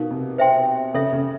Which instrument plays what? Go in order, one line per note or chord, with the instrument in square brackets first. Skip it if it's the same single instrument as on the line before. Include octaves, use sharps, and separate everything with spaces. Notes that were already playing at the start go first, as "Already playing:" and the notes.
Already playing: [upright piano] B2 [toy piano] D#4 A#4 F5
[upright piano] C3
[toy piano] C5 E5 G5 C6
[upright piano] C#3 [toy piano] A4 C#5 E5
[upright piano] C#3